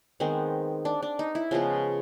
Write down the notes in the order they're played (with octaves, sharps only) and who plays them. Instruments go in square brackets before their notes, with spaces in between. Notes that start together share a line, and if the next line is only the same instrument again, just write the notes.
[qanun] D#3 G#3 B3 C4
D4
D4
D#4
E4
C#3 F3 G#3 B3 F4